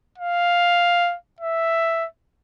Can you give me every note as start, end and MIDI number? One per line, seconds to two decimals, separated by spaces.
0.18 1.16 77
1.40 2.06 76